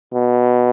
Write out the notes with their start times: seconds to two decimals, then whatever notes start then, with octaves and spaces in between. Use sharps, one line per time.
0.13 B2